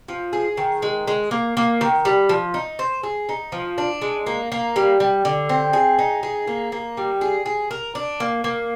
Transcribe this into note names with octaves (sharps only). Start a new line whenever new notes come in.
F3
G#4
D#3
G#3
G#3
A#3
A#3
D#3
G3
F3
D#4
C5
G#4
D#4
F3
D4
G#3
A#3
A#3
G3
G3
D3
C4
G#4
D#4
G#4
A#3
A#3
G3
G#4
G#4
A#4
D4
A#3
A#3